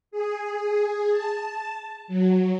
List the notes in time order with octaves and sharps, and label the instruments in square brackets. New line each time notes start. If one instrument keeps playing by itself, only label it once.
[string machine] G#4
A5
F#3